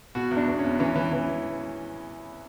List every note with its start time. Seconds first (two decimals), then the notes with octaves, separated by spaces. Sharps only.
0.15 B2 F#4
0.31 E2
0.37 D4
0.47 E2
0.59 C#4
0.64 E2
0.80 E3 C#4
0.96 E3
1.13 E3